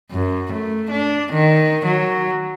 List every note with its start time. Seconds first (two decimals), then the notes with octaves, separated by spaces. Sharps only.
0.11 F#2
0.52 A3
0.91 D4
1.32 D#3
1.85 F#3